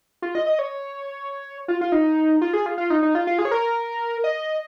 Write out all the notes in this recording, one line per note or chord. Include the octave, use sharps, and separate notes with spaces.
F4
D#5
D#5
C#5
F4
F4
D#4
F4
G#4
F4
F4
D#4
D#4
F4
F4
G#4
C#5
A#4
D#5